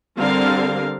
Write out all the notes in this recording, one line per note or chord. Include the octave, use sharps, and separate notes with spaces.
D3 G3 C4 A#4 F5